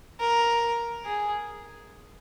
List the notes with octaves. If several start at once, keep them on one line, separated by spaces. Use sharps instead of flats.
A#4
G#4